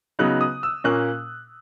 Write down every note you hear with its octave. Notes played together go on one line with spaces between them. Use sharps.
C#3 F#3 B3 D#4 F#6
D#6
E6
A#2 A#3 C#4 F#6